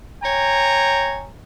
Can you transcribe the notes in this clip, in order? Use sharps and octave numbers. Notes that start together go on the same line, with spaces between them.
C#5 G5 G#5 A#5